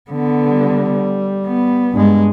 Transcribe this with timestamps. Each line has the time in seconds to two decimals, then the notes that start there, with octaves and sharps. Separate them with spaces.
0.11 D3 B3
0.49 G3
1.46 B3
1.92 G2 G#3